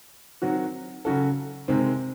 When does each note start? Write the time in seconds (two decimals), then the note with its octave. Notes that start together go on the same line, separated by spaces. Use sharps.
0.42 D#3 F#3 C4 F#4
1.05 C#3 F#3 C#4 F#4 A4
1.68 C3 D#3 G#3 C4